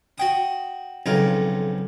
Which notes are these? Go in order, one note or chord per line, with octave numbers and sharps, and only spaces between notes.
F#4 G5 D#6
B1 F2 C#3 A#4